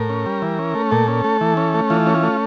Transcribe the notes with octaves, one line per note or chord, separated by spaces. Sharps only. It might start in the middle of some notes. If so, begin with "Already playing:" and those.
Already playing: A2 A#4
C#4
G3
E3
C#4
A3
A#2 A4
C#4
A3
E3
C#4
A3
E3 F4
C#4
F4
A3